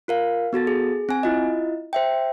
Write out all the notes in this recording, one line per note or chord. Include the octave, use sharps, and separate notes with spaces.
F4 A#4 F5
B3 F#4 A4 A6
G#4
C4 G#5
E4 F4 D#5
C5 E5 G5